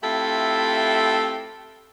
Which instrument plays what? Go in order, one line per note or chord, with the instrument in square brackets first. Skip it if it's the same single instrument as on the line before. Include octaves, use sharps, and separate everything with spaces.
[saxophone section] A3 C4 E4 F4 G4 A4